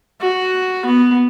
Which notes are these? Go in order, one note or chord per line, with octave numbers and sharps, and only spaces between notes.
F#4
B3